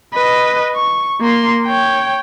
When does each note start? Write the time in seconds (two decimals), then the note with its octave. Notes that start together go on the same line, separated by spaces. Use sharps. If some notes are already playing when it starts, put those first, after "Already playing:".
0.14 B4 D#5
0.75 C#6
1.21 A#3 C6
1.67 C#5 G5